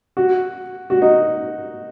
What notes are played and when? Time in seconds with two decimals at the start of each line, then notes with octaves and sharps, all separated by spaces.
0.17 F#4
0.90 F#4
1.02 D#4